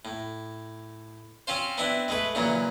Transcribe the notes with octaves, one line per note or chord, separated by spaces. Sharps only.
A2
C4 C#4 F4 C5
B3 C4 D4 E4
G#3 A3 B4
A#2 C#3 E3 F#3